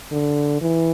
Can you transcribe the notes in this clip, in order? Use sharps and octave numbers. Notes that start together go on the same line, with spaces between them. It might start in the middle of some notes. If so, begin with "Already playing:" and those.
D3
E3